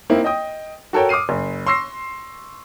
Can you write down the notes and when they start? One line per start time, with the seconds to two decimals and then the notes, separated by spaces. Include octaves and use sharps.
0.10 A#3 C4 D#4 E4
0.24 D#5 G5 D#6
0.93 F#4 A4 A#4 C#5 G5
1.09 D6 D#6 F6 C7 D#7
1.29 F#1
1.67 C6 C#6 E6 A#6 C7